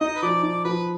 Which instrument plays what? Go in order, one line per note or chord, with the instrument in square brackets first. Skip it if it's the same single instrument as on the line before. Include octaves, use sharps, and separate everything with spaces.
[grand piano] D#4 [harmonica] D#5
[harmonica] B4
[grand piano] F3 [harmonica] D5
[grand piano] D#4 [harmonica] D5
[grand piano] F3 [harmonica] B4